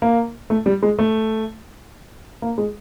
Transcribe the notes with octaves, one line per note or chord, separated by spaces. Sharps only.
A#3
A3
G3
G#3
A3
A#3
G#3